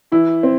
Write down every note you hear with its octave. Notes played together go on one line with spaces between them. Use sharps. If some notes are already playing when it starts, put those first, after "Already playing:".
E3 E4
C4